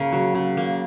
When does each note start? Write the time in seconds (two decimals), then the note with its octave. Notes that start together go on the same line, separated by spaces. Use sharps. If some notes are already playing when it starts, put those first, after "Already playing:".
Already playing: C#3 A#3 A#4 C#5
0.12 F#3
0.35 C#3
0.57 A#3